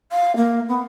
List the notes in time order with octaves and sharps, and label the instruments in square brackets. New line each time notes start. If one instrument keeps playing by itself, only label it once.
[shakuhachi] F5
A#3
B3